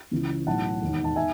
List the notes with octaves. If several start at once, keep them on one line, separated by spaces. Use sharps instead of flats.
C#2 C#3 E3
B1 A2 E3 F#5 A5
E1 D#2 D#3
A5
D#3 E5 G#5